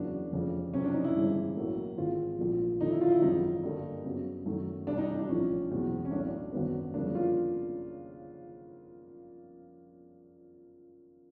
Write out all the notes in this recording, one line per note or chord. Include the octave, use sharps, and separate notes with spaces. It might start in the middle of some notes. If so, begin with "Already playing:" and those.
Already playing: F#1 E2 C#3 F#3 A#3 D4
F1 F2 C#3
F#1 F2 C3 C#4
D4
D#4
E4
G1 G2 E3 G#3 C4
B1 A2 F#3 A#3
G#1 G#2 E3 G#3 C4 F4
A#1 A#2 F3
D#2 D3 F3 D#4
E4
F4
E4
G#1 F#2 C#3 F3 D#4
G2 D3 G3 A#3
F#2 C#3 F#3 B3
F#2 D#3 F#3 A3
C2 C3 E3 G3 D4
D#4
D#4
D4
A#1 A2 F3 C#4
F#1 E2 B2 G#3 C4
C#4
B1 A2 F#3 D4
G#1 F#2 D#3 F#3 B3
G1 F2 C#3 F#3 A#3 D4
F4